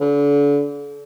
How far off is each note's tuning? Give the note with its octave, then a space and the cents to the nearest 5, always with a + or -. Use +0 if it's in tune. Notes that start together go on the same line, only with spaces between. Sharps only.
D3 -35